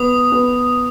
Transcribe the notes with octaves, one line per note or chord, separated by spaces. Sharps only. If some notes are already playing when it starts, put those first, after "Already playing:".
Already playing: B3 D#6
B3